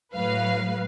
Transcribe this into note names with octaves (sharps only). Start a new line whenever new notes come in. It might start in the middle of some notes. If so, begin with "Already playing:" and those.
A2 F#3 B4 F5